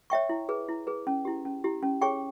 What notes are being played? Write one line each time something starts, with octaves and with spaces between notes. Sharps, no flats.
C#5 E5 G5 C#6
E4
G#4 B4
E4
G#4 B4
C#4
E4 G4
C#4
E4 G4
C#4
G#4 C#5 G5 C#6